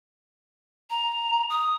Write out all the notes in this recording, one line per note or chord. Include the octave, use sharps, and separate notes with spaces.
A#5
D#6